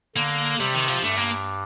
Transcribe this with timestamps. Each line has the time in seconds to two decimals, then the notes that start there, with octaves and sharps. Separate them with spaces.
0.15 D3 A#3
0.59 C3 G3
0.74 D#3
0.88 F3
1.03 G2 A3
1.17 A#3